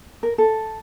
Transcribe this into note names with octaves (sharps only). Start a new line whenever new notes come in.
A#4
A4